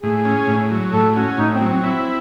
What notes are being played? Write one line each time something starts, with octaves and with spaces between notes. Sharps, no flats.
A2 G#4
C#4
A2
F#3
A2 A4
C#4 F#4
A2 D#4
C4
F#3
C4
E4